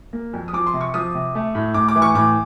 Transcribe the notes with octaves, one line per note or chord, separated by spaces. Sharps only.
A#3
F2
D#6
F3 D6
C6
C3
C#6
F3 D#6
C3
A3
A2
A2 D6
D6
E3
C#6
A2 D6